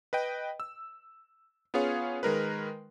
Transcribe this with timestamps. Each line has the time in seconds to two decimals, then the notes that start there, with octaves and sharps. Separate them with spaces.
0.13 B4 D#5 G5
0.60 E6
1.74 B3 C#4 F4 G#4 C#5 F5
2.23 D#3 G#3 A#4 B4